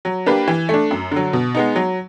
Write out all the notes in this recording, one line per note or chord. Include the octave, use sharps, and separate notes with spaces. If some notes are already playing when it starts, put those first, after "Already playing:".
F#3
A#3 D4 G4 B4
E3
A3 D4
F#2
D3 F#3
B2
G#3 B3 D#4
F#3